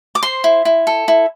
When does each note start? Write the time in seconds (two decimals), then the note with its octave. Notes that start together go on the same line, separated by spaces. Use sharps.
0.15 D6
0.23 C5 C6
0.44 E4
0.65 E4
0.87 A4
1.08 E4